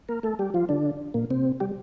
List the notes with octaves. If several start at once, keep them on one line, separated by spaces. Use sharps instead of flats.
A#3 A#4
A3 A4
G3 G4
F3 F4
D3 D4
A#2 A#3
C3 C4
G3 G4